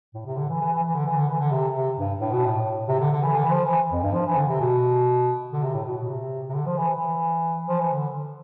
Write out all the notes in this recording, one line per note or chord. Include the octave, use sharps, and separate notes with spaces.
A2
C3
D3
E3
E3
E3
E3
D3
E3
D3
E3
D3
C3
C3
G2
A2
B2
A2
C3
D3
D3
E3
D3
E3
F3
E3
F2
G2
F3
E3
D3
C3
B2
D3
C3
A2
B2
B2
C3
C3
D3
F3
E3
E3
F3
E3
D3